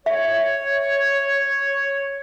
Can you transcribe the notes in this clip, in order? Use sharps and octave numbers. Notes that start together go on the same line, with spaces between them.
C#5 E5